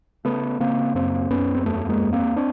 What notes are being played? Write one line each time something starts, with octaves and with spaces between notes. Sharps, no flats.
C#3 A3 B3
C#3 A#3 C4
F#2 A#3 C4
F#2 B3 C#4
C4
E2 A3 B3
G#3 A#3
E2
A#3 C4
C4 D4